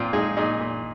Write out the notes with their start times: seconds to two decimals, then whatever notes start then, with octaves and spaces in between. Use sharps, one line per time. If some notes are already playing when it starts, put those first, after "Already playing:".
Already playing: A#2 C4 F4
0.13 G#3 D#4 G#4
0.37 A#2 D#4 G#4
0.61 A#2